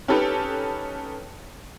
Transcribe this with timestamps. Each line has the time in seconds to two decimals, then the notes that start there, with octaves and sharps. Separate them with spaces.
0.08 C#4 D#4 G4 A4 B4